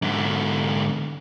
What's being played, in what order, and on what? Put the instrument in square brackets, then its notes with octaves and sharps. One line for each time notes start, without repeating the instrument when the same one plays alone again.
[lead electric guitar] G#2 D3